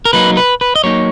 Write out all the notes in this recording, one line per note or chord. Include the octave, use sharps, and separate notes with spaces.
A#4
F#3 A#3 D#4 B4
B4
B4
D#5
F#3 A#3 D#4 C#5